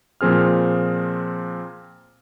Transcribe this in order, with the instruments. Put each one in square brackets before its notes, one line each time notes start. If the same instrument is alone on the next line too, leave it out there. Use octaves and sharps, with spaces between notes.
[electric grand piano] A#2 F3 C4 G#4 F6